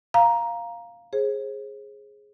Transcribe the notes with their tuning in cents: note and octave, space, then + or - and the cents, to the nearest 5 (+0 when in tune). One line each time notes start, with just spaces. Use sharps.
F5 +0 A#5 +10
G#4 +0 C5 +40